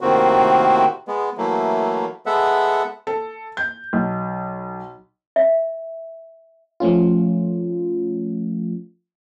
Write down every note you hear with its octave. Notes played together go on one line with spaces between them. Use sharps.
A2 C3 D#3 A#3 C4 F#4
G#3 B3
E3 F#3 A3 A#3
G#3 B3 A4 E5 F#5
A4
G6
B1
E5
F3 A3 C#4 F4